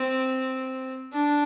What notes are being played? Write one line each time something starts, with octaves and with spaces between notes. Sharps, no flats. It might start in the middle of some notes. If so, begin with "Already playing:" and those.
Already playing: C4
D4